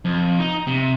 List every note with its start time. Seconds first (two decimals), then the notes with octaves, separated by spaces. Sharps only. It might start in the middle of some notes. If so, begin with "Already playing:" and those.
0.05 F2
0.39 D#4
0.67 C3